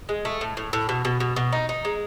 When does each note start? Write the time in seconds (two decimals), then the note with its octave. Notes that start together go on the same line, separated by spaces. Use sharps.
0.09 G#3
0.25 A3
0.41 A2
0.57 A2
0.73 A2
0.89 B2
1.05 B2
1.20 B2
1.36 B2
1.53 D#4
1.69 D#4
1.85 G#3